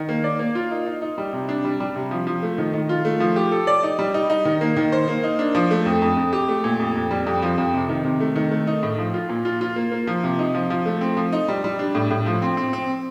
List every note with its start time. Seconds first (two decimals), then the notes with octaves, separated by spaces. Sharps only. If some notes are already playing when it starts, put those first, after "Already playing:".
Already playing: D#3
0.09 A#3
0.24 D5
0.39 A#3
0.55 F4
0.71 D#4
0.86 D#4
1.02 D#4
1.18 G3
1.33 C3
1.49 D4
1.65 G3
1.80 G3
1.96 C3
2.11 F3
2.27 F3
2.43 A3
2.58 D#3
2.74 D#3
2.89 F4
3.05 A3
3.20 F3
3.36 G4
3.52 A4
3.67 D5
3.83 D#4
3.99 G3
4.14 D#4
4.30 D#4
4.45 D#3
4.61 A#3
4.77 D#3
4.92 C5
5.08 A#3
5.24 D#4
5.39 D4
5.55 F3
5.71 A3
5.86 F2
6.02 F2
6.17 F2
6.33 G4
6.49 A3
6.64 A#2
6.80 F2
6.95 F2
7.11 G3
7.26 F2
7.42 F3
7.58 F2
7.74 C3
7.89 D#3
8.05 C3
8.20 A3
8.36 D#3
8.51 A3
8.67 D#4
8.83 A2
8.98 F3
9.14 F4
9.29 A#2
9.45 F4
9.61 F4
9.76 A#3
9.92 A#3
10.07 F3
10.24 C3
10.39 D#4
10.54 F3
10.70 F3
10.86 A3
11.01 C4
11.17 F3
11.33 D#4
11.48 G3
11.64 G3
11.79 D4
11.95 A2
12.10 A2
12.26 F3
12.42 C4
12.57 C4
12.73 C4